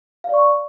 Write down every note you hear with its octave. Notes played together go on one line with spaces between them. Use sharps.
D5 F5 C#6